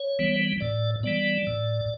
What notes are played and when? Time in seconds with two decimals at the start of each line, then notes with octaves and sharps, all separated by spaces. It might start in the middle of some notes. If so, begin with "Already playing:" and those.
Already playing: C#5
0.19 E3 G3 B3
0.61 A2 D5
1.03 E3 G3 B3 D5
1.47 A2